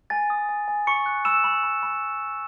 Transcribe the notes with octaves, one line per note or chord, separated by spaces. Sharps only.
G#5 A6
D#6
G#5
G#5
B5 C#6 C#7
F#6
B5 E6 E7
B5
B5
B5